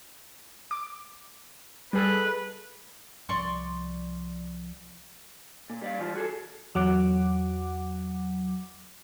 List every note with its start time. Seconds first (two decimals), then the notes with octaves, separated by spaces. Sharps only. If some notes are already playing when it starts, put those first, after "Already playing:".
0.71 D6
1.93 G3 G#4 A4 B4
3.29 C2 F3 D5 C6 C#6
5.70 A#2
5.82 G3 D5 F5
5.99 E3 G3 F4
6.15 F#4 G#4 A4
6.75 E2 F#3 F#5 D6